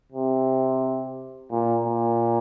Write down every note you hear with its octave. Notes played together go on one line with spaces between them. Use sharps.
C3
A#2
A#2